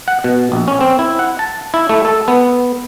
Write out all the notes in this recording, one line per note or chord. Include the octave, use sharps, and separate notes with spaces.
F#5
B2
A#1
C#4
C4
E4
F#5
A5
E4
A3
A4
B3